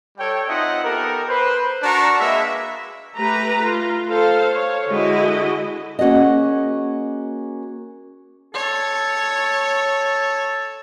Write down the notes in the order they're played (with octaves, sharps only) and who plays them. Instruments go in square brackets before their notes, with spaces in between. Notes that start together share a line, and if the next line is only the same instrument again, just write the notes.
[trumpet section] G3 A4 C#5 G5
C4 D#4 F4 D#5 E5 F#5
B3 G4 A4 A#4
B4 C5
D4 F#4 A#4 A5 A#5 C#6
G#3 A#3 G#4 B4 E5
[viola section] A3 G4 B4 A#5
F4
A4 C5 F5
C#5
D3 G#3 E4 F#4 D#5
[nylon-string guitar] A#3 C#4 F#4 G#4 D#5
[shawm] A4 [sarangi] C#5